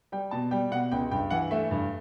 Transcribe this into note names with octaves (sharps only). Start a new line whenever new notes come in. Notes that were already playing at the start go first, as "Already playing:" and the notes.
G3 G5
B2 A5
G3 G5
B2 F#5
C#2 G5
G2 G5
E3 F#5
A3 E5
G2